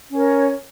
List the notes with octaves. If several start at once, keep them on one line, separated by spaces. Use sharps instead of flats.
C#4 A#4 C#5